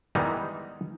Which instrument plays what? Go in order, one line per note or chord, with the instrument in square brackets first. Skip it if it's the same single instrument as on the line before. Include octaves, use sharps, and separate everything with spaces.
[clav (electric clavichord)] D#3 E3 G3 G#3 B3 D#4